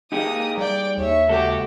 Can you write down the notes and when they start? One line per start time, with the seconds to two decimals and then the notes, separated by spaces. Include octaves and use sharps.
0.12 A#3 D#4 G4 G#4 D#6
0.58 G3 D5 G5
0.97 D#2 C#5 E5
1.28 C#2 F#4 G4 A4